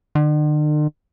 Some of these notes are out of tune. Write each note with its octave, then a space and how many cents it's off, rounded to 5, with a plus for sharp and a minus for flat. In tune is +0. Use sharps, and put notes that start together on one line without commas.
D3 +45